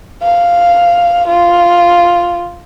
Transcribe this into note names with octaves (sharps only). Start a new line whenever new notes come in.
F5
F4